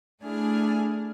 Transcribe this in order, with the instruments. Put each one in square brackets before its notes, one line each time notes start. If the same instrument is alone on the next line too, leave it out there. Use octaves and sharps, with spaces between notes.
[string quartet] A3 D4 E4 G#4 G#5 F6